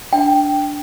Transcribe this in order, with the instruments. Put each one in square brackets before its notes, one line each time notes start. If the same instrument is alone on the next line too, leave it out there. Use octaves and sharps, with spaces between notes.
[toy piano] D4 G5